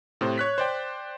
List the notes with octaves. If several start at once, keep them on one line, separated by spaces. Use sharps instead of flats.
A2 C3 C5
C#5 F#6 B6
C5 D5 G5